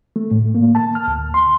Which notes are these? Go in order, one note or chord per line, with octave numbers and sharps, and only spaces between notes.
A3
A2
A#3
A5
F6
D2
C6